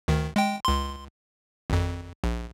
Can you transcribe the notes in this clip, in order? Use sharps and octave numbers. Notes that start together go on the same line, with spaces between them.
D2 D#3
G#3 G5
C#2 C6
G#1 F2
A#1